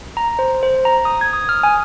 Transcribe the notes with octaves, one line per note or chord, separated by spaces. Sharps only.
A#5
C5
C5
A#5
D#6
G#6
D#6
F6
G#5